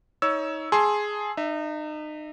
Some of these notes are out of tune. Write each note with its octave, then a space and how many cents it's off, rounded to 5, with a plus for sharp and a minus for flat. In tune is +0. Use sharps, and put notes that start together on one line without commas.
D#4 +25 C#5 +15 E6 +0
G#4 +5 A5 +0 C6 +15
D#4 -35 E5 +0